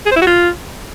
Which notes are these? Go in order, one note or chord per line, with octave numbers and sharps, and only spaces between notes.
G#4
C5
E4
F#4
F4